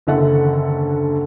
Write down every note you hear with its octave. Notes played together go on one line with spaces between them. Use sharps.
F#1 D#2 D3 A4 E5 F#5